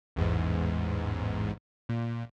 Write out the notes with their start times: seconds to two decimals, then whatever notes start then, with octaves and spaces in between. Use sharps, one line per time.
0.16 A1 E2 G#2
1.89 A#2